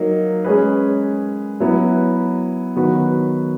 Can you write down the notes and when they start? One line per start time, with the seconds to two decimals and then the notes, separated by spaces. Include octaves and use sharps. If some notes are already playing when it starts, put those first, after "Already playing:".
Already playing: F#3 A#3 D#4
0.44 G#3 C#4 G#4 B4
1.60 F#3 B3 E4 B4
2.76 D#3 F#3 B3 F#4 B4